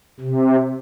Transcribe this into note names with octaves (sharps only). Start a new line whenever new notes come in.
C3